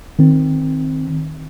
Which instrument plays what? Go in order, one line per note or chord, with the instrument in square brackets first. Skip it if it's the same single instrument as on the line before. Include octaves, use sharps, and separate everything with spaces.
[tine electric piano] D#3 C4